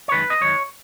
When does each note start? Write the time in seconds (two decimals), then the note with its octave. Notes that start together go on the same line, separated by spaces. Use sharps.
0.08 C#5
0.12 F#2 D#3 G#3 B4
0.30 D#5
0.41 F#2 D#3 G#3 C#5